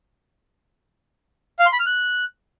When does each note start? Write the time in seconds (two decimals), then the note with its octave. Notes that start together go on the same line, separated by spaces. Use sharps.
1.59 F5
1.66 C6
1.73 B5
1.80 F6
1.86 F#6